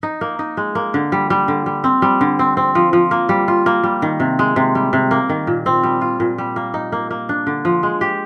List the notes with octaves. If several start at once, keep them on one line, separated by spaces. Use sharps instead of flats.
D#4
A#3
D#4
G#3
A#3
D3
G3
G3
D3
G3
C4
G3
D3
C4
C4
F3
F3
A#3
G3
F4
A#3
G3
D#3
C3
G#3
C3
G3
C3
A#3
D#3
A#2
C4
G3
F4
A#2
G3
A#3
D#4
A#3
A#3
D4
D3
F3
G#3
G4